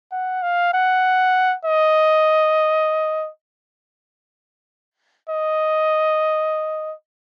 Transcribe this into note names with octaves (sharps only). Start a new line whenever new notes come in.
F#5
F5
F#5
D#5
D#5